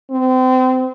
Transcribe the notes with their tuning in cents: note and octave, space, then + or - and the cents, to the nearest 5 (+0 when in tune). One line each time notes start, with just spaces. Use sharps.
C4 -30